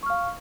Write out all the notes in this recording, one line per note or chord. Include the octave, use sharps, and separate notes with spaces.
F5 C#6 F6